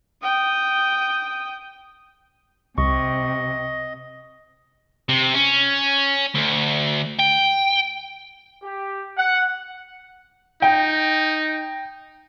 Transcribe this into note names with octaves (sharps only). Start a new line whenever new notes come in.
G5 D#6
C2 C3 D#5 C#6
C3
C#4
D2
G5
G4
F#5
D#4 G5